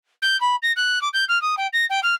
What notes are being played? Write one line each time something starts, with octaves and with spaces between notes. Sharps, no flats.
G6
B5
A#6
F#6
D6
G6
F6
D#6
G5
A#6
G5
F6